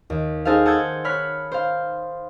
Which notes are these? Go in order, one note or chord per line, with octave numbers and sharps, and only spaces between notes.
D#2
D#4 G#4 A4 C5 F5
F#5 A5 D#6 E6 G6 G#6
C#5 B5 F6 F#6 B6
C5 F5